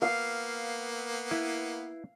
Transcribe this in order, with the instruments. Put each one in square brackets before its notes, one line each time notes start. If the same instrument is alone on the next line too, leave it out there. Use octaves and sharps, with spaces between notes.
[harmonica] A#3 B3 [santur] F5
[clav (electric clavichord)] E4 B4